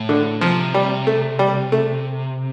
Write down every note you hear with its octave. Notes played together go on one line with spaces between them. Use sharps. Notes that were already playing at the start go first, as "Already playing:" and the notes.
Already playing: A2
D3
C3 F3
G3
A3
G3
A3